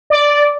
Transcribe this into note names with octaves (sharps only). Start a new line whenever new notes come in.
D5